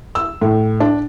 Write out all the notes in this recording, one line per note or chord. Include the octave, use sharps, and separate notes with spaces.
E6
A2
D4